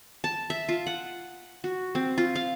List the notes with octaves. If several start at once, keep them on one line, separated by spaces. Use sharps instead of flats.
A5
E5
F4
F#5
F#4
C4
F4
F5